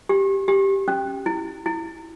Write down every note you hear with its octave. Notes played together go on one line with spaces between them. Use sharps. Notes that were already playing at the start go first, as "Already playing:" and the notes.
G4
G4
C#4
E4
E4